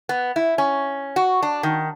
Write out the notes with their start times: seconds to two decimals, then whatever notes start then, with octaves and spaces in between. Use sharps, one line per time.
0.09 B3
0.36 E4
0.58 C#4
1.16 F#4
1.43 D4
1.63 D#3